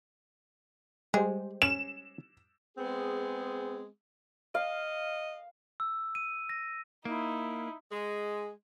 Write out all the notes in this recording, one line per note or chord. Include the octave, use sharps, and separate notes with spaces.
G3 G#3 G4 G#4 C5
C#4 E7
G#3 B3 C4 G#4
D#5 F5
E6
D#7
A#6
A#3 D#4 E4
G#3